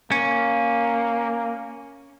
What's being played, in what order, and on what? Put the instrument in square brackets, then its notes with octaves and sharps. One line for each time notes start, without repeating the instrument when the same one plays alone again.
[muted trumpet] A#3 [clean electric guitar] C#4